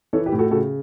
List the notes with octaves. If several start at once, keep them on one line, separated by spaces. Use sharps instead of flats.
E3 A4 C#5
G4 B4
A2
F#4 A4
C#3 F#4 A4